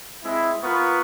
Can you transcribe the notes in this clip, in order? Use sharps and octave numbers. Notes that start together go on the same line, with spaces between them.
G#3 C4 E4
B3 F4 A#4 B4 C#6